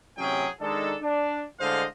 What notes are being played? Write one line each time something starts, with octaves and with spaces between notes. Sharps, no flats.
A1 C3 F#3 C#4 G#4 G5
D#3 G#3 D4 D#4 A4
D4
A2 D3 G#3 C5 D#5 F5